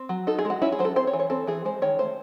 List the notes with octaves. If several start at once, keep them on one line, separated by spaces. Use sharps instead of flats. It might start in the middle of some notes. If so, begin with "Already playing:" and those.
Already playing: C4
F#3
D#4 A4
G#4
G#3
F#4
C#4 E4
G#4
F#3 C5
A4
C4 C5
C#5
E3
C#5
C4 A4
E3 G#4
G#3 C5
D#3 C#5
A3 C5